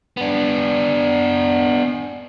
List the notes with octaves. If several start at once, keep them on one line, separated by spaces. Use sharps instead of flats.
B3 D4